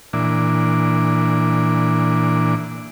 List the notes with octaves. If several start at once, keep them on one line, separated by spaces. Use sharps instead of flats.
A#2 E3 D4